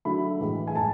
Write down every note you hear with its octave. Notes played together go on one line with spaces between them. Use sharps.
D3 F#3 A3 B5
A2 E3 G#3
G#5
A2 G#3 A5